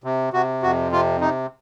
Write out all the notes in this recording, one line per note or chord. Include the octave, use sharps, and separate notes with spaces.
C3
C3 F#4
F2 F#4
C3 F4
C3 D#4